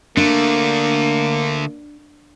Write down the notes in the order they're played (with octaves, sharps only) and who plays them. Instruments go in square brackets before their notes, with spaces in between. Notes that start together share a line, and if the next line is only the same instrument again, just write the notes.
[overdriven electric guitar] D3 A3 [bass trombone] A#3 [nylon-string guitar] D4